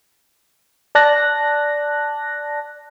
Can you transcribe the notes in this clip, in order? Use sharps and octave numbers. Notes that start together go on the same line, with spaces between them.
D5 A5 F#6 A#6